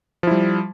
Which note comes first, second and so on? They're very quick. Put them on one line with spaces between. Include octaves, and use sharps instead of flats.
F3 E4 G3